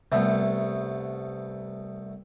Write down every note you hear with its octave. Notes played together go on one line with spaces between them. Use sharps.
C2 A3 B3